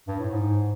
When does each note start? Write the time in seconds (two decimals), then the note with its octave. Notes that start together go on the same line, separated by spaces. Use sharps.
0.08 G2
0.20 A2
0.31 G#2